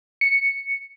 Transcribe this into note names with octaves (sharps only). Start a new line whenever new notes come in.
C#7